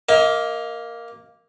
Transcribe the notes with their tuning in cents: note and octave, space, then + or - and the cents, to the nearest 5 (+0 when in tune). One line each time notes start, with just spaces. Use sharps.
A#3 +0 D#5 +35